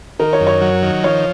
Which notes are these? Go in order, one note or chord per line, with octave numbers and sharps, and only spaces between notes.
D#3 A#4
C#5
F#2
C#5
F#3
D#3
F3 C#5